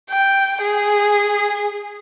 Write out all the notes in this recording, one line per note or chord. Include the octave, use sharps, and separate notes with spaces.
G5
G#4